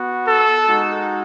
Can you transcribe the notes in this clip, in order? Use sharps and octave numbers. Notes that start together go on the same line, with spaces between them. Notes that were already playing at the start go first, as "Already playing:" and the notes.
Already playing: B3 F#4
A4
G#3 D#4 F#4